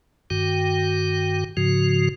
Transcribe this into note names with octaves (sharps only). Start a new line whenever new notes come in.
G2 D#3 F#4 G5
G#2 C#3 F3 F#4